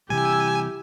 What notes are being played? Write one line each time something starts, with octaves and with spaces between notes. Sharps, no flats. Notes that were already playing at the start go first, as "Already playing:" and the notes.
C3 E3 G3 E4 G4 G#5 E6